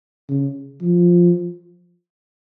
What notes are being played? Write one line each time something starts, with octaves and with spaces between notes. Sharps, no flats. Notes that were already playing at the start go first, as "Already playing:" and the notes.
C#3
F3